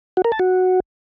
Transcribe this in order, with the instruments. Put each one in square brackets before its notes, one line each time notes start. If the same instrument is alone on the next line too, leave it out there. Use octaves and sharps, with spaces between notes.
[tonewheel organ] F#4
A#4
A5
F#4